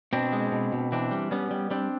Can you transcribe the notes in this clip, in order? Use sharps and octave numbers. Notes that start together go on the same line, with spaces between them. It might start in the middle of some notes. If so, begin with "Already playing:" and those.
B2 C4 D4
G#3
B2
B2
E3 C4 D4
G3
G3 B3 C#4
G3
G3 C4 D4